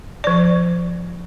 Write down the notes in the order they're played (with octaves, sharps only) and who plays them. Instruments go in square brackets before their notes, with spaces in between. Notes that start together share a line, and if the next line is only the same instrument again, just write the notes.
[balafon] F3 D5